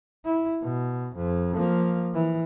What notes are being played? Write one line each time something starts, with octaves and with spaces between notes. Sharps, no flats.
E4
B2
F2
F3 A#3
E3